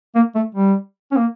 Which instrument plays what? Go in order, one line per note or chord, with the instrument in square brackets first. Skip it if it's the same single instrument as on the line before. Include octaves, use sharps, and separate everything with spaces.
[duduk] A#3
A3
G3
C#4
A#3